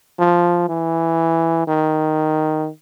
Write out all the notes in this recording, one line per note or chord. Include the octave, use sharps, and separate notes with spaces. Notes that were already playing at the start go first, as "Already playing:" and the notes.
F3
E3
D#3